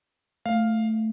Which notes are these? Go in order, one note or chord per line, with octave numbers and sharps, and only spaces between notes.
A3 F5